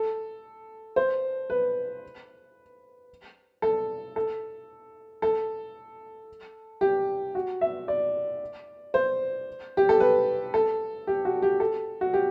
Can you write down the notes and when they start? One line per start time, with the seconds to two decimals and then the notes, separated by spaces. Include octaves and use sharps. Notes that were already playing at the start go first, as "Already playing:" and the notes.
Already playing: A4
0.96 C5
1.50 B4
3.62 A4
4.16 A4
5.22 A4
6.81 G4
7.35 F#4
7.61 E5
7.88 D5
8.94 C5
9.77 G4
9.89 A4
10.00 B4
10.54 A4
11.07 G4
11.25 F#4
11.42 G4
11.60 A4
12.01 F#4
12.14 G4